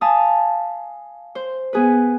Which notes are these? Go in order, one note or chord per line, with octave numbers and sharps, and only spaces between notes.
F5 G#5 A5 B5 D#6
C5
B3 G#4 B4